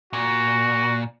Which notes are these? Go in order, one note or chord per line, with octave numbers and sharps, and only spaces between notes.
A#2 F#4